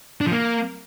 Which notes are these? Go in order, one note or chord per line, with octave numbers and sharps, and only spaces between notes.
D4
F3
A#3